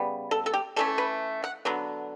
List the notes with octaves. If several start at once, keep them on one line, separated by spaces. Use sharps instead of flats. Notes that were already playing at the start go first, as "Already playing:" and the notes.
Already playing: C#3 G3 B3
A4
A4
G4
E3 A3 C#4 A4
B4
F#5
D3 F#3 B3